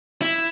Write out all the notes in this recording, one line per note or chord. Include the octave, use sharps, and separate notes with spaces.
E4